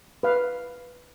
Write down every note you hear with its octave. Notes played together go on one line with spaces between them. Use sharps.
B4 F5